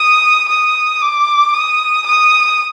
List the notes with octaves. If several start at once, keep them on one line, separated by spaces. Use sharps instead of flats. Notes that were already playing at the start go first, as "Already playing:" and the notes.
Already playing: D#6
D#6
D6
D#6
D#6